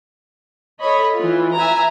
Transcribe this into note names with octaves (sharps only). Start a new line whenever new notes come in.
A4 C#5 D#5 B5
E3 F4
E5 G#5 A#5